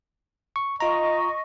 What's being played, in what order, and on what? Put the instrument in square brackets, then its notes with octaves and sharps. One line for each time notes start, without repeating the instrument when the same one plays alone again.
[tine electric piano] C#6
[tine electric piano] F4 A#5 [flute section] D#5 C#6